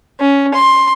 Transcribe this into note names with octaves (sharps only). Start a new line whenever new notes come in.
C#4
C6